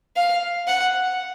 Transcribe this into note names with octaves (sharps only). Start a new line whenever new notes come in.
F5
F#5